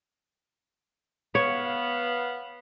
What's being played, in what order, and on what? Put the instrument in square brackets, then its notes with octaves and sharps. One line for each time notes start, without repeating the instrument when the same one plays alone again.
[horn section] B3 F5 [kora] C#5